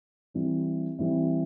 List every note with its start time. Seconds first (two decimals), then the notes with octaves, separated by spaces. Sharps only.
0.34 E3 G3 C4 E4
0.99 E3 G3 C4 E4